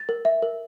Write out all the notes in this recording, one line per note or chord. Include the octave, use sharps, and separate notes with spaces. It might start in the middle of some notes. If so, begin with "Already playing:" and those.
Already playing: A6
A#4
E5
A#4